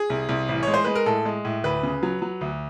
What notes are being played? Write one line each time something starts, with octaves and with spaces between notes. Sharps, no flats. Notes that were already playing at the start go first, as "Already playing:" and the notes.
Already playing: G#4
C2
C2
A1
G#3 C#5
C5
G#3 B4
A#4
A2 A4
G#3
A2
D2 B4
C#3
F#3
F#3
D2